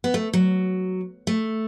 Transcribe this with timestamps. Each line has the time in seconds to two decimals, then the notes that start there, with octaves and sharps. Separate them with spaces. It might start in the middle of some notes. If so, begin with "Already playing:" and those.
0.04 B3
0.14 A3
0.33 F#3
1.27 A3